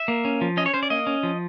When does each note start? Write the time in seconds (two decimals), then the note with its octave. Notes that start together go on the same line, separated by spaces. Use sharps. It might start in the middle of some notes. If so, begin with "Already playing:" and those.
Already playing: E5
0.08 A#3
0.25 C#4
0.41 F3
0.57 C#4 D#5
0.66 C#5
0.74 C#4 C5
0.83 D5
0.90 A#3 D#5
1.07 C#4
1.23 F3